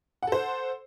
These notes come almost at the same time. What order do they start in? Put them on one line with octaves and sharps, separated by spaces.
F#5 A4 C5